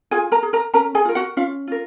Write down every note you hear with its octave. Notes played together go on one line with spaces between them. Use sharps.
F4 G#4 G#5
A#4 A#5
G#4
A#4 A#5
C#4 A#4 A#5
G#4 G#5
F4 A#4
F#4 F#5
C#4 F4 F5
F4 A#4